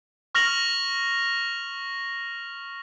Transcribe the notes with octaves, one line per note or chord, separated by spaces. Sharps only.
C#6 F6 A#6 F7 F#7